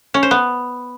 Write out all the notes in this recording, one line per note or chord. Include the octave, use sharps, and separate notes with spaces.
C#4
C5
B3